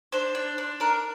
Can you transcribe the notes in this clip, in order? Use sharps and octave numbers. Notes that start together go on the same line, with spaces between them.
D4 C5
D4
D4
D4 A#4